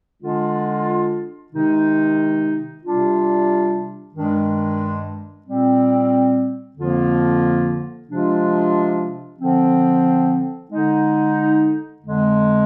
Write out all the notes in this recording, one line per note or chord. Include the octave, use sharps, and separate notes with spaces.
D3 G#3 D4 F4
C3 D#3 G#3 D#4
C3 G3 D4 F4
G2 D#3 G#3 D4
A#2 G3 C4
F2 D3 F3 A#3 F4
C3 F3 G#3 D4 F4
D3 F3 C4
D3 G#3 D#4
F2 D3 G#3